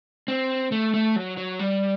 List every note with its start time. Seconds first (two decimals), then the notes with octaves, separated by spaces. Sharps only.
0.28 C4
0.72 A3
0.94 A3
1.16 F#3
1.37 F#3
1.59 G3